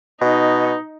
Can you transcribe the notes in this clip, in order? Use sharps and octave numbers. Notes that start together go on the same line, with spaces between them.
B2 D#4